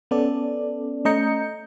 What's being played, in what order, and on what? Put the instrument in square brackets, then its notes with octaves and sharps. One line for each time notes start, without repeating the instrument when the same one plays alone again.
[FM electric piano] B3 C#4 A4 D5
A3 C#4 D#5 A#5 G6 C#7